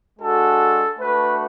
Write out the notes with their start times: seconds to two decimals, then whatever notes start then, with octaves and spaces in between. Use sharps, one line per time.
0.20 G#3 D4 F#4 A4
0.99 A3 D4 F#4 B4